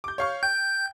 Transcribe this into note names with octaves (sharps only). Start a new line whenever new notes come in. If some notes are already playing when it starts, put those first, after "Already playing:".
D6 G6
C#5 F5 C#6
G5 G6